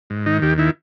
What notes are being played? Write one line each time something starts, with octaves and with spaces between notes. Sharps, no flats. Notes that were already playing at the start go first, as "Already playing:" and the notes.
G#2
D#3 D#4
D#2 G4
D#3 E4